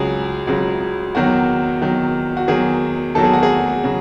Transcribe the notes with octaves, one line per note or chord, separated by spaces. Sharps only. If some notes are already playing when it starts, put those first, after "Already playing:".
Already playing: C#2 C#3 F#3 G#4
C#2 C#3 F#3
E2 D#3 F#3 F#4
E2 D#3 F#3
F#4
E2 D#3 F#3 G#4
E2 D#3 F#3 A4
G#4
F#4
G#4
C#3 F#3